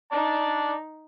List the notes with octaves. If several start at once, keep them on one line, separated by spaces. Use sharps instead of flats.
D#4 D5 A5